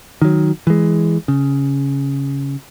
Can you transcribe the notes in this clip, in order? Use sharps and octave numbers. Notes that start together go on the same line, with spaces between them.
D#3 F#3
E3 G#3
C#3